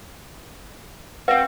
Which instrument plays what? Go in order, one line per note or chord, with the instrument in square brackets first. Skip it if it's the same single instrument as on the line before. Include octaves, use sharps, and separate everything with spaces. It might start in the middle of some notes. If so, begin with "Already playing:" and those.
[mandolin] C4 F#4 [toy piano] B4 F5